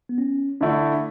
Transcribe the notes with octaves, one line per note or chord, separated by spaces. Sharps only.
B3
C#4
D3 A3 D4 E4